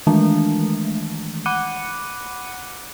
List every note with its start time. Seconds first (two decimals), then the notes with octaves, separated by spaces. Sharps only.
0.07 D#3 E3 G#3 A3 D4
1.46 F#5 B5 D6 F#6 C#7 D#7